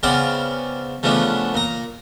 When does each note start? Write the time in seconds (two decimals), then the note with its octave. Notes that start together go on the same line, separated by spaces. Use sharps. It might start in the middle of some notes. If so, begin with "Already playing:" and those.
0.03 C#3 B3 C4 D5 F5 G5
1.03 C#3 F3 A3 B3 D4
1.54 A#2 A#5